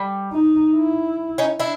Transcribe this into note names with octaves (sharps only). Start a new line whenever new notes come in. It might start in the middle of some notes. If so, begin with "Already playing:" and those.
Already playing: G3
D#4
E4
C#4 D#4
D4 E4